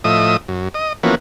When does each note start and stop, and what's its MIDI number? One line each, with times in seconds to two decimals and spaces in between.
0.04 0.37 45
0.04 0.37 53
0.04 0.37 75
0.04 0.37 76
0.04 0.37 87
0.48 0.68 42
0.74 0.93 75
1.03 1.15 52
1.03 1.15 53
1.03 1.15 58
1.03 1.15 59
1.03 1.15 61
1.03 1.15 66